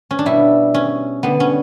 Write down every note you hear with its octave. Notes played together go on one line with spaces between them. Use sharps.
C#4
D4
B2 G3 E4
C#4
D3 G3 B3
C#4